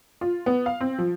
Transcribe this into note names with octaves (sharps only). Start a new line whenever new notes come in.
F4
B3
F5
C4
F3